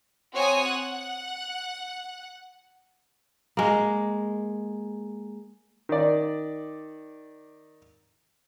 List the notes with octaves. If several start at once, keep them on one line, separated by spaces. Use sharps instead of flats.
C4 F#4 C#5 G#5 D#6
F#5
G#3 A#3
D#3 D5